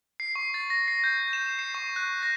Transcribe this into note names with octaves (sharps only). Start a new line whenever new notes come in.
C7
C#6
A6
A#6
C7
G6
E7
C7
C#6
F#6
A#6